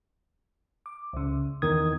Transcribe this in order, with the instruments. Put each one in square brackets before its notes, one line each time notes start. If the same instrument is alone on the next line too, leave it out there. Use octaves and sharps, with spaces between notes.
[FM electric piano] D6
C#2 C#3
[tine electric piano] E2 D#3 D#6 [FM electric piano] G#6